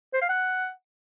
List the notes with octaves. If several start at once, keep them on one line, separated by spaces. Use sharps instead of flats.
C5
F5
F#5